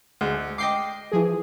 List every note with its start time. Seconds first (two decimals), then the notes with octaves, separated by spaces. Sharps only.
0.21 D2 G#3
0.58 D#5 G5 D6 C7
1.12 E3 F3 G#4